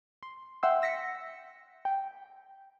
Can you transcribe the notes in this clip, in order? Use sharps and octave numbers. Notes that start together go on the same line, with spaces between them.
C6
E5 F#5 G5 C6 E6
E6 A#6 B6 C#7
G5